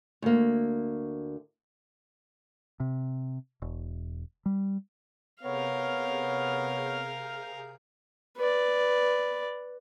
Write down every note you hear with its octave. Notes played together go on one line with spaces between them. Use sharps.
D2 A#3
C3
E1
G3
C3 B3 G#4 A#4 C#5 F5 G6
B4 D5